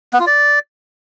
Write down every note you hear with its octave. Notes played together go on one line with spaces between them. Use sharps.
B3
F4
D5